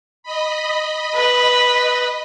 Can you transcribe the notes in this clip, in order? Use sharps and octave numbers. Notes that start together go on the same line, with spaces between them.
D#5 B5
B4